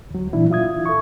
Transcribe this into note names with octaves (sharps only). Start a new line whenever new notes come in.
D2 F#3
A#2 E3 D4 E4
F4 E5 D#6 G#6
A4 C#6